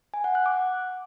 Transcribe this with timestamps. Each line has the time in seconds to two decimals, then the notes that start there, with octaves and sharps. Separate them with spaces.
0.14 G#5
0.24 F#5
0.35 F#6
0.46 D6